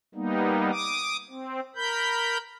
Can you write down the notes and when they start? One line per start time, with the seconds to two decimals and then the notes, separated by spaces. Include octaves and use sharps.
0.15 G3 A#3 B3 D#4
0.71 D6 D#6
1.30 C4
1.76 A#4 B5 G6